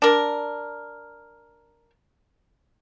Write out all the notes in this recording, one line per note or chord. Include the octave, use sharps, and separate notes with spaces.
D4 A#4